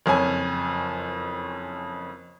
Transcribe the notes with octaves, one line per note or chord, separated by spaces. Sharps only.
F#1 F2 C#5 G#5